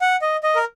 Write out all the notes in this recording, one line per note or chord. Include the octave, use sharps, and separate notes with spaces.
F#5
D#5
D#5
A#4